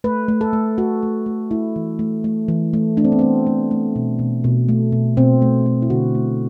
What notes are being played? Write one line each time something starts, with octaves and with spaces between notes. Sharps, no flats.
A3 B4
A3
A4
A3
A3 F#4
A3
A3
A3 E4
E3
A3
A3
E3
A3
A3 D4
C4
B3
A3 C4
A3
A3
B2
B2
B2
A3
B2
B2 C4
A3
A3
E4
D3 F#4
A3